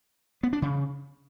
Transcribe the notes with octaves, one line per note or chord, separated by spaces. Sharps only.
B3
D4
C#3